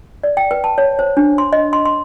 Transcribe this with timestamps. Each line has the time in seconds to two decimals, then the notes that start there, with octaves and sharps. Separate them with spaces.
0.23 D5
0.37 G5
0.51 B4
0.64 A5
0.78 C#5
0.99 C5
1.17 D4
1.38 C6
1.53 D#5
1.73 C6
1.85 C6